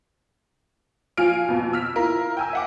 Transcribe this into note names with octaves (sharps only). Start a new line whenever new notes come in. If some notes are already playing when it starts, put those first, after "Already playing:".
F3 F5 G#5 F6 D7
F2 B2
E6 F6 B6
E4 F4 A#4
G5 G#5 E6
E5 F#5 D6